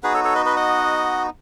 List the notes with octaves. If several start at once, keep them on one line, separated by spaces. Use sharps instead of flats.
B3 D#4 F#4 G#4 B4
A4 C#5
A4 C#5
B4 D#5
B4 D#5
D#5 F#5